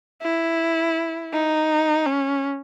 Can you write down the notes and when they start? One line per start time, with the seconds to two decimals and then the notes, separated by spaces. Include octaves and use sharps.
0.22 E4
1.33 D#4
2.06 C#4